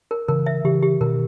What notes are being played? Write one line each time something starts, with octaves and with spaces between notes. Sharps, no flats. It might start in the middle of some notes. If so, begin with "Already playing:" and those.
A#4
C#3 E3 A#4
E5
C#3 E3 G4
G4
B2 D#3 A#4